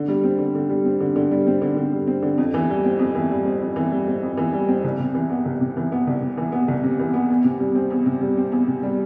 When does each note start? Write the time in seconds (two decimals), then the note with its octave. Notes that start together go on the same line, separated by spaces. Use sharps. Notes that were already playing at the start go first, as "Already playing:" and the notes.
Already playing: D3
0.08 G3
0.23 C4
0.39 D3
0.55 D3
0.69 G3
0.85 C4
1.00 D3
1.16 D3
1.31 G3
1.47 C4
1.62 D3
1.76 D3
1.93 G3
2.07 C4
2.22 D3
2.38 F2
2.54 E3
2.70 G3
2.85 C4
2.99 F2
3.15 E3
3.31 G3
3.46 C4
3.62 F2
3.76 E3
3.92 G3
4.08 C4
4.23 F2
4.37 E3
4.53 G3
4.69 C4
4.84 C2
4.99 C3
5.14 E3
5.30 B3
5.46 C2
5.61 C3
5.77 E3
5.92 B3
6.07 C2
6.22 C3
6.37 E3
6.52 B3
6.68 C2
6.84 C3
6.99 E3
7.14 B3
7.30 E2
7.44 C3
7.60 G3
7.75 C4
7.90 E2
8.06 C3
8.21 G3
8.38 C4
8.52 E2
8.68 C3
8.83 G3